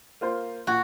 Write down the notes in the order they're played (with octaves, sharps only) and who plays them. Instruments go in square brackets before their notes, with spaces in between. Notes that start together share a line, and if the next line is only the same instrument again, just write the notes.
[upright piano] A#3 F4 C5
[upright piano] A#2 [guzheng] F#4